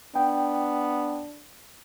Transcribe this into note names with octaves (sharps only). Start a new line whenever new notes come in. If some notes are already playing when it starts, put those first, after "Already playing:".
B3 D4 G5